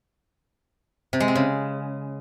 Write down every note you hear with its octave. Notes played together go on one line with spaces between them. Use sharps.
C3
G#3
C4
C#3